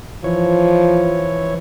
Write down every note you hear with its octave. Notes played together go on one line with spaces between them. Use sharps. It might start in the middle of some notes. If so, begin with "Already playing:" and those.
E3 F3 C#5